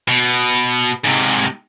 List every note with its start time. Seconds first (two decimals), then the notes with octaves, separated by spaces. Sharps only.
0.08 B2
1.05 G#2 C3